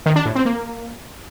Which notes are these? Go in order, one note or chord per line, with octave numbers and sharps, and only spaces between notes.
D#3
D4
A2
C4
A#3